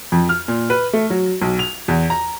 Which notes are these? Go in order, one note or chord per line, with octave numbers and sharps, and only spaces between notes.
F2
F6
A#2
B4
A3
F#3
B1
F7
E2
A#5